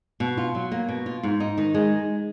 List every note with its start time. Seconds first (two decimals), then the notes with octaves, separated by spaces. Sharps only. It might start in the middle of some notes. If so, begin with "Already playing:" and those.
0.20 B2
0.37 F4
0.55 F#3
0.72 A#3
0.89 B2
1.06 F4
1.23 G#2
1.40 D#4
1.58 D#3
1.74 G#3